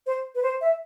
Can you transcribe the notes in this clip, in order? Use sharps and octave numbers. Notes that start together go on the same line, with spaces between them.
C5
B4
C5
E5